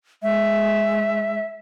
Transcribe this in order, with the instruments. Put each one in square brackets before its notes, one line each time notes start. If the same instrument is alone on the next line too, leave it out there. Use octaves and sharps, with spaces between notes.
[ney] G#3 [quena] E5